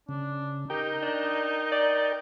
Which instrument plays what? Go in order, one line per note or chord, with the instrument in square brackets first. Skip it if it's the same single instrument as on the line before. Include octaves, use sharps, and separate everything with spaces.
[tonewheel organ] C#3 [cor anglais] D4
[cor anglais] D#4 [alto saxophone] G4 [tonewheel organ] A#4 G5
[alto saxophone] D4
D5